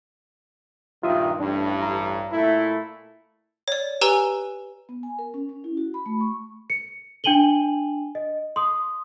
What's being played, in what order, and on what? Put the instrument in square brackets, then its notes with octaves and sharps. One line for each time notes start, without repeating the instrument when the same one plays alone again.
[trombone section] G2 A#2 D#3 [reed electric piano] F4 E5 D#6
[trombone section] A1 G2 [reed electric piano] D4
[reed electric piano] A#5
[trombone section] A#2 A3 E4
[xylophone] C#5 D5
G4 B4 G#5 A#5 E6 G7
[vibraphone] B3
G#5
A#4
C#4
C#4
E4
F#4
B5
A3
C#6
[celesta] C#7
D4 G5 G#5 D#7 F#7 G7
D#5
C6 D#6